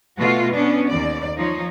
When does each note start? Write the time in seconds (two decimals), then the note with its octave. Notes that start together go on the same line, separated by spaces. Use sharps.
0.18 B2 A3 F4 F#4
0.52 B3 C#4 D4
0.87 D#2 D5
1.35 F3 D#4 C#5